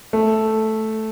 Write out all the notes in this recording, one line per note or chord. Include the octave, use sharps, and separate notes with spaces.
A3